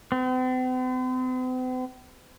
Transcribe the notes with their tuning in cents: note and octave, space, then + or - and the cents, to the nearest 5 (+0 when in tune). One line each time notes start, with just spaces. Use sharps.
C4 -45